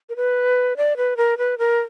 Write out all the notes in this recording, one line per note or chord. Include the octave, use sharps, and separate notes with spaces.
A#4
B4
D5
B4
A#4
B4
A#4